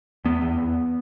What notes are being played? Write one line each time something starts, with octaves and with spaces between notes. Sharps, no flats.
E2 B3
E2
E2